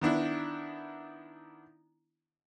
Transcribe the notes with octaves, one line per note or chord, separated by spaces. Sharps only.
D#3 B3 D4 E4